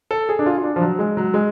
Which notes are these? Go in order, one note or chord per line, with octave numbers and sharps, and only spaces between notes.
A4
G#4
D4
F4
F4
D4
F3
F#3
G#3
F#3
G#3